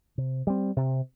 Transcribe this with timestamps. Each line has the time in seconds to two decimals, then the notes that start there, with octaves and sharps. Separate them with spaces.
0.18 C3
0.47 G3 C4
0.77 C3